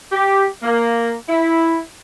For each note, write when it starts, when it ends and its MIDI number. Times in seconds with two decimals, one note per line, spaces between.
0.12 0.45 67
0.63 1.14 58
1.29 1.76 64